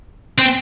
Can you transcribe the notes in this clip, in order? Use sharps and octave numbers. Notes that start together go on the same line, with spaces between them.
C4